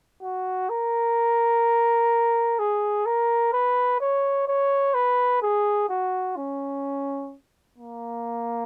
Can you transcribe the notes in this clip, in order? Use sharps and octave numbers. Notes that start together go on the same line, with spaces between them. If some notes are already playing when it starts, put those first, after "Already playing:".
F#4
A#4
G#4
A#4
B4
C#5
C#5
B4
G#4
F#4
C#4
A#3